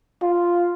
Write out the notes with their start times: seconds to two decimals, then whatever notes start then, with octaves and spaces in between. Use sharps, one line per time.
0.23 F4